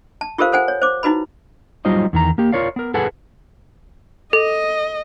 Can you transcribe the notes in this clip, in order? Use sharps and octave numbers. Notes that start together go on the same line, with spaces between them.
A5
F4 G4 A4 A#4 C5 F5
A4 C5 F#5 G#5
C#5
C5 D6
D#4 E4 F#4 B4 B5
F#3 G3 D#4 F4 C5 D#5
E2 D#3 A#5
A#3 G4
F4 A#4 C#5 D5 F5
B3 A#4
G#4 A4 B4 F#5 G#5
A4 D#5